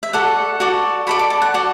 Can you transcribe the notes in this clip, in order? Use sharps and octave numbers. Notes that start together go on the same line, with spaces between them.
E5
F#4 A4 D5 F#5
F#4 A4 D5
F#4 A4 D5 B5
D6
A5
F#5
F#4 A4 D5